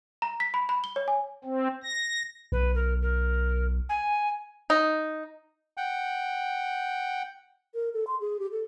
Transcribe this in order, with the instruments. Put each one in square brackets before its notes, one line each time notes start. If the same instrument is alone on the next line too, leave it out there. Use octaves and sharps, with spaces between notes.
[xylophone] A#5
B6
B5
B5
G7
C#5
G#5
[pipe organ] C4
A#6
[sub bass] B1 [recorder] B4
[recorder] A#4
A#4
G#5
[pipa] D#4
[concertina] F#5 G5
[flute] A#4
A4
C6
G#4
G4
A4